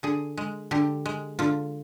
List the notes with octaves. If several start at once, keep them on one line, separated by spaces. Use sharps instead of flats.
D3 G#4
G#3
D3 G4
G#3
D3 F4